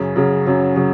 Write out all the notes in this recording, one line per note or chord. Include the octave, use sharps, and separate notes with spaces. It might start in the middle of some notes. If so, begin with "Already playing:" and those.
Already playing: F#2 C#3
F#2 C#3 F#3
F#2 C#3 F#3
C#3 F#3